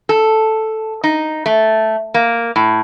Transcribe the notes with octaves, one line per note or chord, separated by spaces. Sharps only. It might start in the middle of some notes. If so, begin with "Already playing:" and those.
A4
D#4
A3
A#3
A2